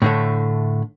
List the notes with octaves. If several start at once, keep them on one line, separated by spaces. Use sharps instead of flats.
A2 D3 A3